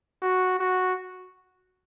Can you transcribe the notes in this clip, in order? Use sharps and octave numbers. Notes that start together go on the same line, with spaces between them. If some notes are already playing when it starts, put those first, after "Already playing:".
F#4
F#4